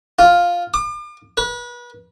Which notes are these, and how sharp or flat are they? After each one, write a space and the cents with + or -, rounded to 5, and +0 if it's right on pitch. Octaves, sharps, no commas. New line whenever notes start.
F4 +5
D6 +40
B4 -35